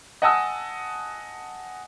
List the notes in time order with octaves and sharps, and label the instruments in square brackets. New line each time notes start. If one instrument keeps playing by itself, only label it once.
[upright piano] D#5 F#5 G#5 A5 D#6 E6